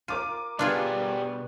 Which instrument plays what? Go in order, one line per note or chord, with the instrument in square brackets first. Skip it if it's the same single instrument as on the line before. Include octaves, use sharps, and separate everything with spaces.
[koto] F4 [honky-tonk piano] A#4 D6 D#7
[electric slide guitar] B2 B4 D5 [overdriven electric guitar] G3 B3 [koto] D4 F4 G#4